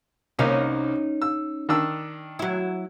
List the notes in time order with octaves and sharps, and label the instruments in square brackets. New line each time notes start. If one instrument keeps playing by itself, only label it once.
[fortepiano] C2 A#3 [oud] C#4 D#4 F5
[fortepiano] E6
D#3 D4 E6
[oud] F#3 E4